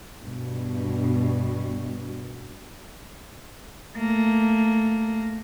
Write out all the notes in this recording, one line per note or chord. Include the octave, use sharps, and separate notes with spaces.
G2 B2
A3 A#3